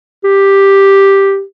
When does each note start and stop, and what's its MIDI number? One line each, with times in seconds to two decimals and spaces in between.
0.24 1.43 67